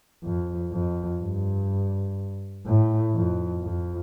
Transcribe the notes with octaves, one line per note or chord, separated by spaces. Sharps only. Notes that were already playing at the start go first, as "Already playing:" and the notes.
F2
F2
G2
A2
F2
F2